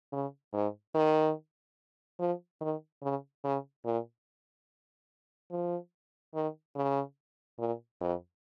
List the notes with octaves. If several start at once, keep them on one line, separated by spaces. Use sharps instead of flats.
C#3
G#2
D#3
F3
D#3
C#3
C#3
A#2
F3
D#3
C#3
A#2
F2